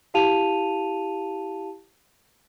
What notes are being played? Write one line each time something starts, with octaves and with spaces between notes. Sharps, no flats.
E4 G4 F5 A5 D#7 F7